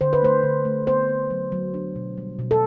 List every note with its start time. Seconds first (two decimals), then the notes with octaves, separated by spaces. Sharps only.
0.01 D3 C5
0.13 B4
0.22 A3 C5
0.44 D3
0.65 A3
0.87 B3 C5
1.09 B3
1.30 F#3
1.52 F#3
1.74 D4
1.96 B2
2.17 G3
2.39 B2
2.51 A4